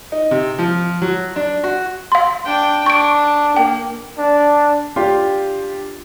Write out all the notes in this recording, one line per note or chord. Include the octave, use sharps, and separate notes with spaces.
D#4
C3
F3
F#3
D4
F#4
F5 C6
D4 G5
D4 C#6 D7
A#3 G5
D4
D4 F4 G4 C6